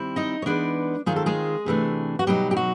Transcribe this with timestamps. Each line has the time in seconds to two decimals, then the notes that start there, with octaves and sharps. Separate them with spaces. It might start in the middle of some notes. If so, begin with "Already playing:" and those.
Already playing: D#3 G3 C4 E4
0.16 D#4 D#5
0.42 C#5
0.46 E3 G#3 B3 D4 D#4 D5
1.06 D#3 G#3 C4 F4 G#4
1.16 A4
1.26 G#3 G#4
1.66 C3 E3 A3 D4
2.19 F#4
2.27 B2 F#3 G3 B3 D#4 G4
2.51 G4
2.57 F#4